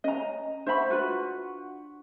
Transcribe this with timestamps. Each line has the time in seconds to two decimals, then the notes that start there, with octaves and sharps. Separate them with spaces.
0.04 C#4 D#5 A#5
0.66 D4 C5 E5 F#5 B5 C#6
0.90 F4 F#4 B4